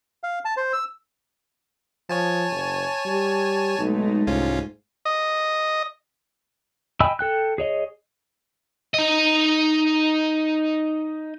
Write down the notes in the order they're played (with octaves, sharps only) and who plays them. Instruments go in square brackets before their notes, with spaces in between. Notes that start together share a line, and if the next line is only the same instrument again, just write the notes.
[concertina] F5
A5
C5
E6
[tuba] F3 [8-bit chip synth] C#5 G#5 A5
[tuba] F#1
G3
[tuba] B1 [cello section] G#3 A3 D#4
[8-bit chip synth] C2 C#4 F4 [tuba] G#2
[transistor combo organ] D#5
[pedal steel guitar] D#5 G5 G#5 B5 E6
A4 G5 F#6
G#4 C#5 D#5
[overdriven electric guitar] D#4 D#5